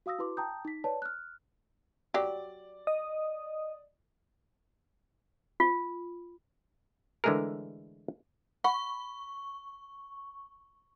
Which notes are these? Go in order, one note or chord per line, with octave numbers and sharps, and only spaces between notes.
F#4 F5 D#6 E6 A#6
E4 F#4 B4 C6 D6
G5 A5 A#5 D#6 G6
D#4 B6
B4 C#5 D5 A5
F6 F#6
F#3 G4 D5
D#5 D#6
F4
D3 E3 G#3 A3 G#4 A#4
F#5 B5 C#6